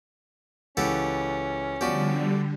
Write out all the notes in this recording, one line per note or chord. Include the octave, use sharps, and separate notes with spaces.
C#2 E3 C#4 G4 A4 B4 F#5
D3 F3 G3 B3 F#4 G4 D5